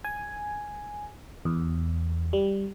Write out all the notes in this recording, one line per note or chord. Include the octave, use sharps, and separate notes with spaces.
G#5
E2
G3